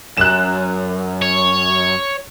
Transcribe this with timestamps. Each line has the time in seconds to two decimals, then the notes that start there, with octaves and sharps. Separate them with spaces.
0.17 F#2 F#6 E7
1.22 C#5